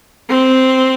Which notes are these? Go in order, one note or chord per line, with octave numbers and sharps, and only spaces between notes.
C4